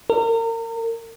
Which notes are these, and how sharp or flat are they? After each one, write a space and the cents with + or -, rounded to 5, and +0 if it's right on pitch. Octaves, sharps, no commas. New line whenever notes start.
A#4 -35